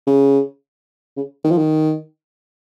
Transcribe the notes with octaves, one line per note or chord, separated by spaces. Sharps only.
C#3
C#3
D#3
F3
D#3